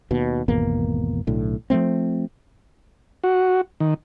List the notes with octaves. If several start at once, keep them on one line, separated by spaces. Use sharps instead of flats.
D#2 B2
G#1 E2 B2 A#3
B1 A2 D3
F3 F#3 A3 C4
F#4
D#3